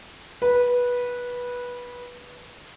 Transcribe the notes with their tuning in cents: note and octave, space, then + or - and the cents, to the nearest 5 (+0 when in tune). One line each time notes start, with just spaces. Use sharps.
B4 -15